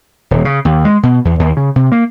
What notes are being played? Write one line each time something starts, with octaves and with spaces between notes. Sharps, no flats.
D#1
C#3
D#2
G#3
B2
E2
D#2
C#3
C3
A#3